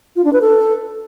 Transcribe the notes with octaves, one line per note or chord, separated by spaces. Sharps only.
F4
D4
B4
A4